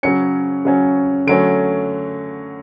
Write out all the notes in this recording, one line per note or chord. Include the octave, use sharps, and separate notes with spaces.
C#3 F#3 C#4 C#7
C#3 F#3 C#4
D3 F#3 A3 C#4 D7